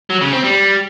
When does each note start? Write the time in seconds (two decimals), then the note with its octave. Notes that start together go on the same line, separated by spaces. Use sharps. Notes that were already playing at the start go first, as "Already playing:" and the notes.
0.10 F#3
0.22 C#3
0.33 C4
0.44 G3